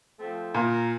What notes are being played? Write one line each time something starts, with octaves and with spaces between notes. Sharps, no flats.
F3 A3 C4
A#2 A#4 A#5